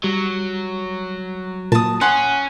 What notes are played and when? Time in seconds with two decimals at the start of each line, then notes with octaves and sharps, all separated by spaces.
0.04 F#3 G3
1.72 A#2 A5 D#6
2.01 C#4 F#5 G#5 C6